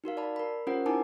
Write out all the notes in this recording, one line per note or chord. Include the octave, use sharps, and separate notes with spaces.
D#4 F#4 A#4 F5
D5 A5 B5
A#4 B5
C#4 F4 G4 A#4 C5 F#5
D#4 E4 A#4 G#5 A5 D6